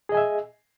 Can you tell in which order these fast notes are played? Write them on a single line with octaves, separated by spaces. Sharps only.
G#4 D#5 G#5 E5